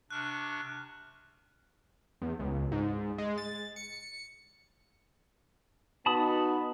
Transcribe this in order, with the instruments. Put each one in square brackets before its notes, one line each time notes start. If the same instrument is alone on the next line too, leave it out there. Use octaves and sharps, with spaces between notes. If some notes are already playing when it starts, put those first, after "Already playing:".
[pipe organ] C3 D4 C#6 [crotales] F6 F#6
[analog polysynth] E2
C#2
G#2
G#3
A6
C#7
[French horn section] B3 D#4 F#4 [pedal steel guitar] A5 B5 D#6